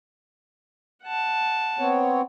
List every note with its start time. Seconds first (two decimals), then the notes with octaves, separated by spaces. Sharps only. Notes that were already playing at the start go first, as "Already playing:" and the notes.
1.03 F#5 A5
1.79 B3 C4 C#5